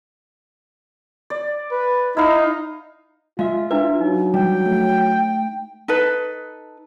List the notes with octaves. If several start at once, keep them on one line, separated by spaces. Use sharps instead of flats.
D5
B4
D#4 E4 E5 F5
G#3 F4 E5 F5
D4 E4 B4 E5
F#3 D#4
F3 G3 G5
A3
D#4 A4 B4